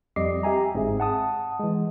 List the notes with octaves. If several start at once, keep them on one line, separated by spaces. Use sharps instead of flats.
F2 G3 D#5 D6 C7
G4 E5 G#5 A#5
G1 G#2 C4 D#4 G#4 E5
F#5 A5 D#6
E3 G#3